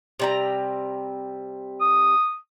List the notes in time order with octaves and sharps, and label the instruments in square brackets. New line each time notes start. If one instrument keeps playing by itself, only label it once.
[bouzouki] C3 G3 A#5
[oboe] D#6